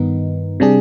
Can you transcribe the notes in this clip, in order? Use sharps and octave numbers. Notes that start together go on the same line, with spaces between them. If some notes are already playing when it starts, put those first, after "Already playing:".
Already playing: G2 D#3 B3 D#4
C3 G3 D4 G#4